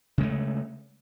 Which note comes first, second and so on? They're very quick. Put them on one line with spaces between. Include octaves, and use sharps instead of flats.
C#3 G#3 A3